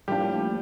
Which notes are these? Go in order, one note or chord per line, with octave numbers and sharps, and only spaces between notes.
A2 F3 G3 A#3 D4 G4